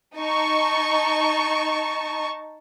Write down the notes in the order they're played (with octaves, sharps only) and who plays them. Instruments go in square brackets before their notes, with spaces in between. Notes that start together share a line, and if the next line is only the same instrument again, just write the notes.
[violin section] D#4 A5 C#6